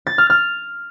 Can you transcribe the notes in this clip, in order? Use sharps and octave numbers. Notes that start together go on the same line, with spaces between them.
A6
F6
F6